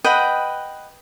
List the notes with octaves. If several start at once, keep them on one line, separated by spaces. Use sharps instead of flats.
B4 D#5 F#5 G5